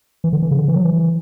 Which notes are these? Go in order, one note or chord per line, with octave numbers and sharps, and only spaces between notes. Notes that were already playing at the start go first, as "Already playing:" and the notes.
E3
D3
E3
C#3
D3
E3
F#3
E3